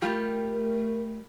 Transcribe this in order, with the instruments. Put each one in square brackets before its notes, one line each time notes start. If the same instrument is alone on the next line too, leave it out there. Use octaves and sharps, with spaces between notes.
[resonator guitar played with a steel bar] G3 F4 G4 [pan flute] A3 [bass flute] A#4